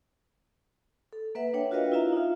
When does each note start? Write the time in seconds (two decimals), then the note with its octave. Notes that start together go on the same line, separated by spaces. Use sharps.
1.13 A4
1.35 A#3 B4 E5 F#5
1.54 D4 C#5 G5
1.71 F4 F#4 A#4 B4 D#5 F5
1.92 E4 F4 E5 F5 A#5
2.12 D#4 F4